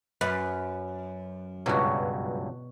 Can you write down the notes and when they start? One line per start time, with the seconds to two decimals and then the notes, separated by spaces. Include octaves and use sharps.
0.21 F#2 B4
1.66 C#2 G2 B2 F#3 F#4